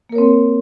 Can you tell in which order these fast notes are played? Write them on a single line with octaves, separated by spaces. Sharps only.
A#3 A#4 C#5 C4